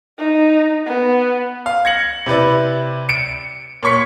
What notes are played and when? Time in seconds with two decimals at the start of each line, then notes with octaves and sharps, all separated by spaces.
0.18 D#4
0.87 B3
1.66 F5
1.85 G#6 A#6 C#7 F#7
2.26 C3 E4 B4 D5
3.09 C#7 D7
3.83 A#2 C#5 C#6 B6 C#7